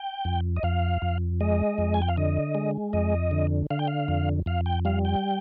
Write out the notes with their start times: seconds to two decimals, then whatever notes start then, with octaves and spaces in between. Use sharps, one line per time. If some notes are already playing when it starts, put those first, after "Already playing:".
Already playing: G5
0.25 F2
0.56 D#5
0.63 F2 F5
1.02 F2
1.41 G#3 D#5
1.78 F2
1.94 G#5
2.02 G5
2.08 F5
2.17 D3 D#5
2.55 G#3
2.93 F2 D#5
3.31 D3
3.70 D3 F5
3.79 G5
3.87 F5
4.08 F2
4.46 F2 F5
4.66 G5
4.85 G3 F5
5.05 G5